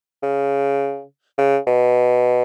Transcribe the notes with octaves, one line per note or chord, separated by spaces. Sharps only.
C#3
C#3
B2